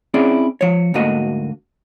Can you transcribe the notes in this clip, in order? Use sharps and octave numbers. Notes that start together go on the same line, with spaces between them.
C4 C#4 E4 G#4 D5
F3 C#5
D2 G#2 A3 A#3 F#4 D#5